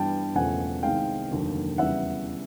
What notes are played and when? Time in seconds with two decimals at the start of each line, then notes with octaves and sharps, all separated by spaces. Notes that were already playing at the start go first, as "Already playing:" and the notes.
Already playing: G2 E3 G3 B3 G5 A5
0.35 E1 E2 C#3 F3 A3 F#5 G#5
0.83 C2 C3 D#3 G#3 F5 G5
1.31 F1 D#2 D3 F#3 A#3
1.78 E2 C#3 E3 G3 E5 F#5